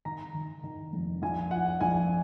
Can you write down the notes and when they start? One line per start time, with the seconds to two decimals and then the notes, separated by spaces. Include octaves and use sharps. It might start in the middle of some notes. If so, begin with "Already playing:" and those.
0.05 D#3 A#5
0.35 D#3
0.64 D#3
0.93 F1
1.22 A#1 G#5
1.51 F3 F#5
1.81 A#1 G#5